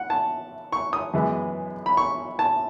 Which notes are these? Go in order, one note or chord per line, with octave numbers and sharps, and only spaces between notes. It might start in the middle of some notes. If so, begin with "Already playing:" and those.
Already playing: F#5
A5
C#6
D#6
F#2 E3 G#3 B3
B5
C#6
A5